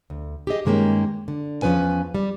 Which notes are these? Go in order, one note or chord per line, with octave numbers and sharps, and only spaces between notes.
D2
G4 G#4 D#5
G2 D#3 G#3 A#3 C#4 G4
D3
E2 F3 C#4 B4 G#5
G3